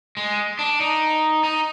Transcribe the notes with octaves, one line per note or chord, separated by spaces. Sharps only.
G#3
D4
D#4
D#4